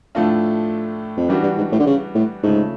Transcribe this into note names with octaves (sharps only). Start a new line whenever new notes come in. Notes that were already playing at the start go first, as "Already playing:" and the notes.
A2 F3 A3 D4 F4
F2
F#2 E3 G3 B3 D4 F#4
G2
G#2
A2
D3
C#3
A2
G#2 C#3 F3 A3